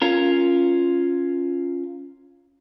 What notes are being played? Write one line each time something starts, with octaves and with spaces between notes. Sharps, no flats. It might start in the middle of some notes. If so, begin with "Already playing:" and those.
C#4 F4 A#4